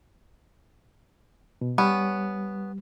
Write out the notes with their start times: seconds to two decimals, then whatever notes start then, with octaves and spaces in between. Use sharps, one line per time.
1.61 B2
1.78 G3 B3 C#4